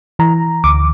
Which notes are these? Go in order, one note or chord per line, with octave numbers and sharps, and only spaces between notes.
E3 A#5
D2 D6